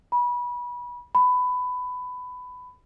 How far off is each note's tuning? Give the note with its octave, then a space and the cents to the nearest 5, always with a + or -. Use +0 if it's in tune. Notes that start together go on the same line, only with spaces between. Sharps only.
B5 -25
B5 +15